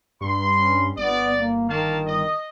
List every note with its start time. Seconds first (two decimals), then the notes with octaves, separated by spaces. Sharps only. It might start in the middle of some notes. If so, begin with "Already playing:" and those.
0.21 G2 B5 C6
0.52 C#4
0.98 G1 B3 D5
1.36 A#3
1.69 D#3 A#3 F5 A5
2.06 D#5